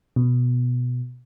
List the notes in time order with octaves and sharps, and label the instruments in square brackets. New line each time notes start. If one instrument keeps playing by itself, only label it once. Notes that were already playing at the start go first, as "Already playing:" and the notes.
[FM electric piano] B2